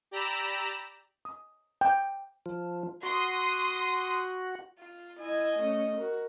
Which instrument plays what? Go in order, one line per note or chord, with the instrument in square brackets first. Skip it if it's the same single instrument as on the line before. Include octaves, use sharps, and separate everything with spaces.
[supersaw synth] G4 D5 A#5 B5 E6
[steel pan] D#6
G5
[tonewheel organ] F3
[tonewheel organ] F#4 [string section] C6 D#6
[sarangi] F4
[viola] E4 G#5 [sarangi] D#5
[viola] A3 C#4
F#4 A#4